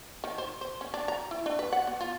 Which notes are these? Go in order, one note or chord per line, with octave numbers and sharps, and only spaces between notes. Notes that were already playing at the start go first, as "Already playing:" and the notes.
D#3
C5
C5
C#4
D4
A#5
E4
D4
B4
F#5
B3
F4